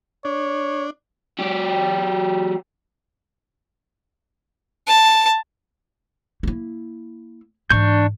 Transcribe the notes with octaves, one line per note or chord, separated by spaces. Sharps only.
D4 C#5
F#3 G4
A5
A#3 E4
G#2 E3 D4 C#6 G6